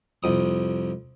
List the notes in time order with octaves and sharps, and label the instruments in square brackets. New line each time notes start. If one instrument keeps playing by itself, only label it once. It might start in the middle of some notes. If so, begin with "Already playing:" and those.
[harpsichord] C2 F2 D#6